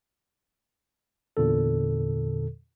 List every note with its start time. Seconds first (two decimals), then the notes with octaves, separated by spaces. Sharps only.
1.37 E2 A#2 D3 A4